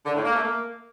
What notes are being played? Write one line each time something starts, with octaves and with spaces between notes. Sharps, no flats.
D3
A2
A#3
A3
A#3